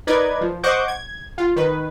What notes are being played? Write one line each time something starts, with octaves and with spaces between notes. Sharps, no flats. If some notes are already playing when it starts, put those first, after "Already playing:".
D#4 A#4 B4 D5 D#5 G#6
F3
C5 D#5 F#5 C#6 D6 G6
G#6
F4
D#3 B4